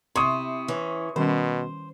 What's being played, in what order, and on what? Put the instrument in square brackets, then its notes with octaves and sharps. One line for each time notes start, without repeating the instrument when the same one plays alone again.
[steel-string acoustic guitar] C3 E4 [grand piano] C6 C#6 D#6
[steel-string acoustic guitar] E3 C#4
[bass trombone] B2 [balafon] D#3 G3 C#4 [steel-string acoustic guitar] C5